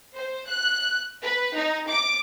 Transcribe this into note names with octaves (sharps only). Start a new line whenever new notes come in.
C5
F#6
B4
D#4
D6